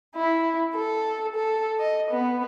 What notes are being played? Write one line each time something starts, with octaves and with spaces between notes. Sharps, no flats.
E4
A4
A4
D#5
B3